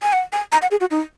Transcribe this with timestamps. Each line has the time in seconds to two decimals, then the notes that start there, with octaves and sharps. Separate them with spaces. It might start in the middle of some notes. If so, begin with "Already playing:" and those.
0.02 G#5
0.13 F#5
0.33 G#5
0.52 A#5
0.62 F#5
0.71 G#4
0.80 F#4
0.91 D#4